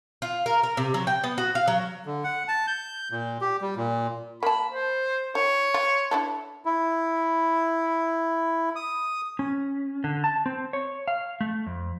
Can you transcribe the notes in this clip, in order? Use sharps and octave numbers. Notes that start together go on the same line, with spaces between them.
F4
A#4
A#4
C3
F#3
G5
B3
F#4
F5
F#3
D3
F#5
A5
G6
A#2
G4
G3
A#2
A#3 A5 B5
C5
D#3 C#5
F4
D4 E4 A4
E4
D#6
C#4
D3
A5
C4
C#5
F5
A3
F2